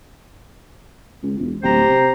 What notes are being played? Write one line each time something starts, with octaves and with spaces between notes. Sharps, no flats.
C#2
E1
D1 G4 C5 A#5
C3